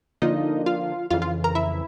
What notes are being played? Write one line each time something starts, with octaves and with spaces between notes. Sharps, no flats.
D3 F3 A#3 D4 D#4 F4 D#5
F4 F5
F2 C#3 E3 F4 F5
F4 F5
A#4 A#5
E4 E5